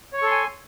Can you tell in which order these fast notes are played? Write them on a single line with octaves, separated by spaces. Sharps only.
C#5 C#6 A4 C6 G#5